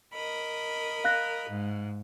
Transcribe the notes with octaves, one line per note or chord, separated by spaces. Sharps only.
A#4 D#5 B5
F5 F#6 A#6
G#2